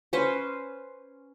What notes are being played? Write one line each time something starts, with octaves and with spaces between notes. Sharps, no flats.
C#4 B4 C5